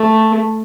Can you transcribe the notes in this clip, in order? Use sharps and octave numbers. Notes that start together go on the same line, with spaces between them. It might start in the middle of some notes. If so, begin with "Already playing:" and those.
Already playing: A3